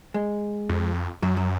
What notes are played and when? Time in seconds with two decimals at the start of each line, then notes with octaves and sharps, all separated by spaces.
0.14 G#3
0.69 F2
1.22 F#2 F#3
1.37 F#3